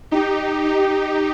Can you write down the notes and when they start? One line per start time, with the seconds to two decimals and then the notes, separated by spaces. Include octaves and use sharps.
0.11 D#4 G4
0.65 D#4 G4